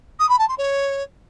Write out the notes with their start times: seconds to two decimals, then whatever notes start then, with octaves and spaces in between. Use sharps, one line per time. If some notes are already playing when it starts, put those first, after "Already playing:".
0.19 D#6
0.29 B5
0.39 A5
0.48 C6
0.58 C#5